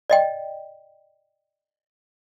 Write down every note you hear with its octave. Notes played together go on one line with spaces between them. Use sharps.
D5 D#5 G5